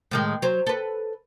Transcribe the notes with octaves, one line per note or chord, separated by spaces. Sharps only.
A2 D#3 G#3
F#3 C5
A4 B4